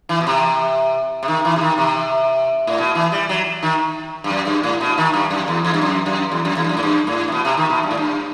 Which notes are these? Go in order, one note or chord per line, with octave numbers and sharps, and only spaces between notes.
E3
B2
C3
C3
D#3
E3
C3
D#3
C3
A2
B2
E3
G3
F#3
D#3
G2
F#2
G2
A2
B2
D#3
G2
F#2
E2
E2
G2
F#2
F#2
E2
F#2
E2
G2
F#2
A2
G2
A2
C3
B2
C3
D#3
B2
G2
A2
G2